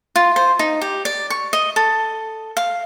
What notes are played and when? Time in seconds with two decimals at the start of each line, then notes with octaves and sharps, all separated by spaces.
0.16 F4
0.36 C5
0.59 D#4
0.82 G4
1.05 D5
1.30 C#6
1.53 D#5
1.76 A4
2.57 F5